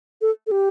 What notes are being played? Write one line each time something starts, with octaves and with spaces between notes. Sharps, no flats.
A4
A4
G4